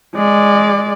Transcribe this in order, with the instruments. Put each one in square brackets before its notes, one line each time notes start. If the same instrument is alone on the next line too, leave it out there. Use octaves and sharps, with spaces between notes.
[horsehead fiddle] G#3 D5